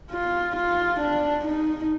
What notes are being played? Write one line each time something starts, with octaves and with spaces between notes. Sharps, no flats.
F4
F4
D4
D#4